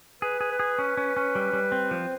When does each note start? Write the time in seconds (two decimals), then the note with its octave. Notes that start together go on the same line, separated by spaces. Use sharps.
0.22 G#4 B4
0.41 G#4
0.51 B4
0.59 G#4
0.79 C#4
0.97 C#4
1.17 C#4
1.35 G3
1.53 G3
1.72 C4
1.91 F3 C5